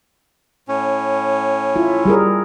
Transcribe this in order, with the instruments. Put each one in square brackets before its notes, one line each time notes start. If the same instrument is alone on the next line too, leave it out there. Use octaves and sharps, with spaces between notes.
[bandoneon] A2 C#4
[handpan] E4 F4
G3 G#4 A#4